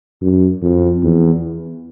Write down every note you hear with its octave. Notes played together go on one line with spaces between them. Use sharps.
F#2
F2
E2